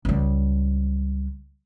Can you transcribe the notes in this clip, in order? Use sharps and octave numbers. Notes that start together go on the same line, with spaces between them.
C#2 G3